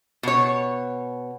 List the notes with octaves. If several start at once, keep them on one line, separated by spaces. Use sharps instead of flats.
B2 C#5